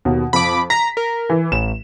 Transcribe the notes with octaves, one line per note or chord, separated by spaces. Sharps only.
D#2 B2
F2 B5 D6
A#5 B6
A#4
E3
A1 E7